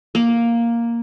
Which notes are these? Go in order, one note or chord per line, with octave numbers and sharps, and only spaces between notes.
A#3